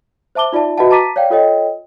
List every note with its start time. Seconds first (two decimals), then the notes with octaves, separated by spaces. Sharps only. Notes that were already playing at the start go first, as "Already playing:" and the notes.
0.35 C5 E5 A5 D6 G7
0.53 D#4 F4 D5 E5 A5
0.78 F#4 B4 D#5 E5 F#5 A5
0.91 A5 A#5 D6 A6 B6 D#7
1.16 C#5 D5 F5 G5
1.30 F4 A4 C#5 D#5 G5